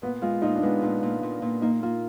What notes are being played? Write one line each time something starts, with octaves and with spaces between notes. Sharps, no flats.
A#2 B3
G#3 F4
A#2 D#4
D4
G#3 B3
A#2 D4
A#2
A#2
A#2
A#3 D#4
A#3 F4